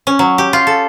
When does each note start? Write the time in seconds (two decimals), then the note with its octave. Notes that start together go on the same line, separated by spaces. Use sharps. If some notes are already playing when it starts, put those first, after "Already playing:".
0.07 C#4
0.19 F#3
0.38 G4
0.53 F4
0.67 A4